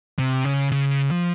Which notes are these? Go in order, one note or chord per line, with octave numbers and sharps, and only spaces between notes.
C3
C#3
C#3
F3